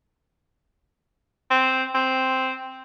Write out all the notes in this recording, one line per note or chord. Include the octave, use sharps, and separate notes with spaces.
C4
C4